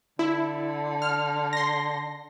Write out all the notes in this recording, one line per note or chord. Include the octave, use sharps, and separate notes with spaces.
D3 E4
F6
C6 A#6